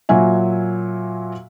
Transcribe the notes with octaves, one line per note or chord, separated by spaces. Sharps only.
A#2 F#3 F#4 E5 G#5